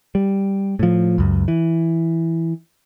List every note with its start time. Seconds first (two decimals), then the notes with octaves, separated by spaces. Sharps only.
0.15 G3
0.79 A2 F3
1.18 C#2 F#2
1.48 E3